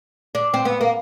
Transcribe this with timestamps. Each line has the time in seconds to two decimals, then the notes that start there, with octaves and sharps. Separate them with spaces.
0.35 D4
0.54 C4
0.65 B3
0.81 A#3